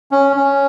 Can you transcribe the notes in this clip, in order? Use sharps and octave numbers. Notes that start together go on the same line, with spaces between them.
C#4
C#4